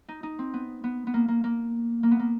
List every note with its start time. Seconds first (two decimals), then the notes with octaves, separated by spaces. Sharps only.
0.08 D#4
0.23 D#4
0.39 C4
0.54 B3
0.84 B3
1.07 B3
1.14 A#3
1.28 A#3
1.44 A#3
2.03 A#3
2.11 B3
2.20 A#3